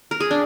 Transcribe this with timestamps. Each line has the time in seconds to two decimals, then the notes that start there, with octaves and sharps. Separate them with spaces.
0.11 A#4
0.20 G#4
0.31 D4